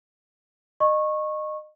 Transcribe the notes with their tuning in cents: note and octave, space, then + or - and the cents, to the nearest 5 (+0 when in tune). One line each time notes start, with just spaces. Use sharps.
D#5 -25 C#6 -20